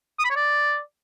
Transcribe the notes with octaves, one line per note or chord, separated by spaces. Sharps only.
D#6
B5
C#5
D5